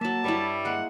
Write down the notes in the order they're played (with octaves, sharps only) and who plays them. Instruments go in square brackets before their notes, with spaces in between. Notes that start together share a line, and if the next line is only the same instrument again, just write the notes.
[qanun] F#3 E5 [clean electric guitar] A#3 [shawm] A5
[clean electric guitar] G2 B4 [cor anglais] G3 [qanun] E4 C#5 C#6
[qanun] G#3 A#3 [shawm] F#5